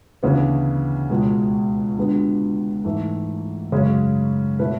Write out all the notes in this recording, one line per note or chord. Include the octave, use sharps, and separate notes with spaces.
D2 C#3 E3 B3 D4
C#2 B2 G#3
D3 G#3 B3 F#4
G#2 E3 A3
F#2 C#3 G#3 C#4
B2 A3 E4 B4